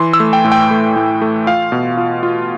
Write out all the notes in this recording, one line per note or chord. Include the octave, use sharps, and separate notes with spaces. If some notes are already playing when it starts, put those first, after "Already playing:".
Already playing: E3 C6
E6
A3
G5
A2
G5
A3
A2
A3
F4 F5
B2
F4
F4